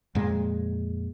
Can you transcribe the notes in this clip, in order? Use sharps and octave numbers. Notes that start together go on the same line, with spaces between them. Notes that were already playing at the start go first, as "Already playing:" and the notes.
F2 A#2 G#3